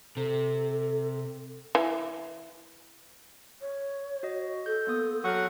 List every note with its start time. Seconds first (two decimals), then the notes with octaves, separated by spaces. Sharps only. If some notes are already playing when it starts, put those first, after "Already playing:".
0.17 C3 A4
1.75 E3
3.61 C#5
4.23 F#4 D#5
4.66 A4 G6
4.87 A#3 B3 D#6
5.24 F#3 A4 F#5 C#6 F6